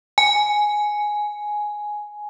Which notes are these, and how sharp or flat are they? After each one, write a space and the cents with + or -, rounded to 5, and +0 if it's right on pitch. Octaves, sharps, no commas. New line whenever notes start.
G#5 +5